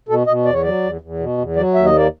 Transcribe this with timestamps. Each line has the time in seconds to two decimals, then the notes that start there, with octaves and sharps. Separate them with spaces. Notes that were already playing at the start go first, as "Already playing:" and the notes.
0.09 B2 A4
0.27 B2 D#5
0.45 E2 D5
0.54 C#5
0.62 F#3 D5
0.82 E2
1.01 E2
1.19 B2
1.38 E2
1.56 F#3 D5
1.74 D#2 E5
1.85 D#5
1.93 A#3 D5